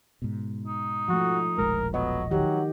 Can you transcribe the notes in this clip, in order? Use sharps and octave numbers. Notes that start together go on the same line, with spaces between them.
G#2 B2
D#4
F3 A3 F#4
E1 A#1 G#3 A#4
F#3 B3 D#5
D#3 F#3 G4 F#5